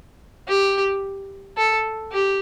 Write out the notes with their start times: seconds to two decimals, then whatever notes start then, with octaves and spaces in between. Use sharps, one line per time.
0.48 G4
1.57 A4
2.12 G4